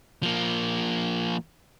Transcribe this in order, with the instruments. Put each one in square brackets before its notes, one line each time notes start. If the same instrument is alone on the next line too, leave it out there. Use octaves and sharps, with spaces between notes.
[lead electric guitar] F3 A#3